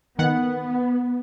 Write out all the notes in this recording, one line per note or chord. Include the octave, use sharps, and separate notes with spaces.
D#3 B3 F#5